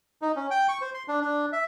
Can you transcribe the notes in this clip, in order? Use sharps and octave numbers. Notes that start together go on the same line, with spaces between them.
D#4
C#4
G5
C#6
C5
C6
D4
D4
E5